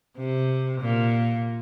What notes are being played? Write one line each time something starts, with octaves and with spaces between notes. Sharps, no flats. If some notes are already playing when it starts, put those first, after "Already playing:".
C3
A#2